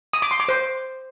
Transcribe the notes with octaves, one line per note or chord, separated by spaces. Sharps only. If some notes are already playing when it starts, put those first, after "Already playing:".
D#6
D6
C6
D6
C5